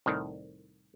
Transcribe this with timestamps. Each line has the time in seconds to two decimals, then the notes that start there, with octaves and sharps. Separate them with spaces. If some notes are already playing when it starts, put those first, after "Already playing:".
0.06 C2 A2 D#3